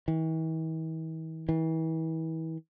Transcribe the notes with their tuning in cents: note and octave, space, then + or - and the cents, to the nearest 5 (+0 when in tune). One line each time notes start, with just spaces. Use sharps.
E3 -45
E3 -35